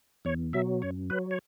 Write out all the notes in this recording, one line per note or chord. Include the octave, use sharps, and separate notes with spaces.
E2 C#5
B2 F#3 E5
F#2 C#5
F#3 B4
C#5